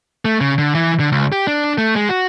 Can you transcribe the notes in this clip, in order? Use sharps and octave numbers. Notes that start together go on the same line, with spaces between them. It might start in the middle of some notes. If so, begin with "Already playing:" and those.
A3
C#3
D3
E3
D3
C#2
G4
D4
A3
G#3
F#4